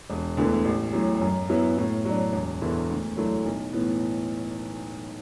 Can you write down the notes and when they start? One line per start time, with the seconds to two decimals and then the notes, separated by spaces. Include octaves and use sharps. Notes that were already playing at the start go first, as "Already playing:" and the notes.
0.10 E1
0.37 D2 D3 B3 E4
0.65 A1
0.93 A2 F#3
1.21 F#2
1.49 F#3 B3 E4
1.77 A2
2.05 F#3 D4
2.33 E1
2.61 E2 D3 B3 E4
2.89 D2
3.17 D3 F#3 A3 E4
3.46 B1
3.73 A2 E3 B3